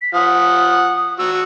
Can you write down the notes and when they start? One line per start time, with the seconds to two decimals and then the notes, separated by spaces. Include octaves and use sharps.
0.02 B6
0.14 F3 F#5 D#6
1.19 F#4 C#6 E6